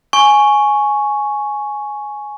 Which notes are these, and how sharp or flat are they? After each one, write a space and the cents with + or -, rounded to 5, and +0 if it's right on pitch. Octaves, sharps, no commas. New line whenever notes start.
G#5 +10 C#6 +0